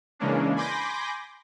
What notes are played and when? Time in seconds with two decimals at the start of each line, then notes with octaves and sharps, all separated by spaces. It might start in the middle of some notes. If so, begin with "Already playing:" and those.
0.19 C#3 E3 G#3 A#3 C#4 D4
0.56 G#5 B5 C6 D6 G6 A#6